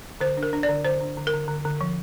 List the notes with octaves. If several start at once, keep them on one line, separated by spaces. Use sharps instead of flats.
D3 C5
D4
A#4
D4
D5
D3
D3 C5
D4
D3
A#4
D3
D3
D3
F3